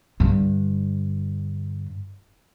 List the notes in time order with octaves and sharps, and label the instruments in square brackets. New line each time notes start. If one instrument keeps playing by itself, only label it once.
[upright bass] G2 D3